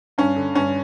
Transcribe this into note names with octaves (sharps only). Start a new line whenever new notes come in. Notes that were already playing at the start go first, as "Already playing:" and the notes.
G2 C#4
D3
G2 C#4